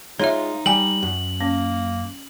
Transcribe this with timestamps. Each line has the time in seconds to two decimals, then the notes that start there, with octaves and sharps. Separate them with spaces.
0.20 G#3 D#4 F4 C#5 E5
0.66 G3 G5 G#5 F#7
1.03 F#2
1.41 A#3 C#4